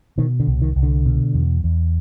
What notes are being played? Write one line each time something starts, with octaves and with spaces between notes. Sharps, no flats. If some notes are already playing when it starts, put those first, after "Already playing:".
B2 D#3
D3
C2
D#3
C2
D3
B2
E2
E2